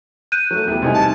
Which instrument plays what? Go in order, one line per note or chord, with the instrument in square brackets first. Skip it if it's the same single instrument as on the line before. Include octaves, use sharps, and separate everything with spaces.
[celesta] F#6 G6 D#7
[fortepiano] F#3 A3
E2 G4
C2 D#4 G#5
[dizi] A5